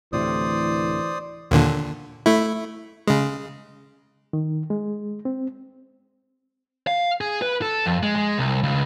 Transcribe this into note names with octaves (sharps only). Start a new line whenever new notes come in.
D2 A2 C3 E3 C5 D5 D#6
D#2 A#2 D3
A3 E4
C#3 G#3
D#3
G#3
C4
F5
G#4
B4
A4
F2
G#3
G#3
C2
C#2